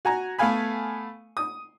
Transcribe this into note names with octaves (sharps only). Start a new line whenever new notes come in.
F#4 G#5 A#5
A3 B3 A4 F5 G#5 B5
D#6